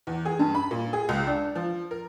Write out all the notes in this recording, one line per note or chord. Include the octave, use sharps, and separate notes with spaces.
E2
G#4
G2
B5
A#2
G#4
C#2
D4
F3
A#4